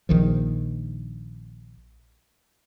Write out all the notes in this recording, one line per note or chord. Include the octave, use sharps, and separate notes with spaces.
A#1 D#3 F3